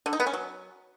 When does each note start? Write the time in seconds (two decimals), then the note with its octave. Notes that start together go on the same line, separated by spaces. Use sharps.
0.06 D3
0.13 D#4
0.20 B3
0.27 C#4
0.33 F#3